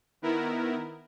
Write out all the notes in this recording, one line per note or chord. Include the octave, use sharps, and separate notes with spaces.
D#3 B3 E4 A#4